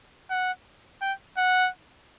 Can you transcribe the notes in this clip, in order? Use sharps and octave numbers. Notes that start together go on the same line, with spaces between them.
F#5
G5
F#5